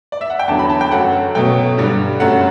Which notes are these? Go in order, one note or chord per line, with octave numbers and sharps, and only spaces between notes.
D5
E5
F#5
G5
E2 D3 F#3 A5
B5
A5
G5
F#2 F#3 A3 F#5
B2 F#3 A3 G5
G2 D3 G3
F#2 F#3 A3 F#5